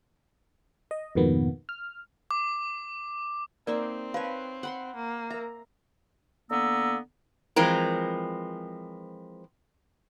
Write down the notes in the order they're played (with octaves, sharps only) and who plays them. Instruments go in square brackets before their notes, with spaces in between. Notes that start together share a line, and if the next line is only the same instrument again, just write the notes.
[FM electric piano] D#5
F2 G#2 B2 D#3 A#3 B3
F6
[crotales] D6
[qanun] A#3 D#4 E5 [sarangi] C4 [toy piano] A#4 D5
[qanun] B4 C#5 [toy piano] F5 G#5 A5
[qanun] F#5 B5 C6
[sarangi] A#3
[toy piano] A#4 E5 [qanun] A#5
[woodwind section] D3 A#3 B3 A#5 E6
[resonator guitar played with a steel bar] E3 F3 G#3 C4 A#4